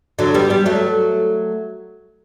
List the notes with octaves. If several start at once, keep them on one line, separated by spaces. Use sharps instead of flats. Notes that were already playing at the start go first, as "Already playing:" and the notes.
D3 F#3
G3 B3
G3 B3
F#3 A3